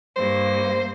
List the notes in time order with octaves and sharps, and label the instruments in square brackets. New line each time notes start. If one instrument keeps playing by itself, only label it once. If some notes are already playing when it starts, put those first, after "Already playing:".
[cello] G2 A#3 [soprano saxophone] C5